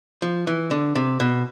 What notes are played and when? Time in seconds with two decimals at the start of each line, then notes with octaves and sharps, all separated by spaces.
0.22 F3
0.47 E3
0.71 D3
0.95 C3
1.20 B2